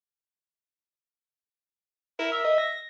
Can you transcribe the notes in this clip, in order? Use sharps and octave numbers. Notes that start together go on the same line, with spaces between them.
E4 A#4
E5
D#5
A#6